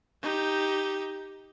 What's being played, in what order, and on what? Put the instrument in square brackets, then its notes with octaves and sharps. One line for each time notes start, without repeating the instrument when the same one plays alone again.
[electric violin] D#4 G4